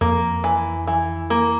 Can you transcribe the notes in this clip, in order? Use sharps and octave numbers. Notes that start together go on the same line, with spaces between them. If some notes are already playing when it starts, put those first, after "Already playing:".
F2 A#3
E3
E3
A#3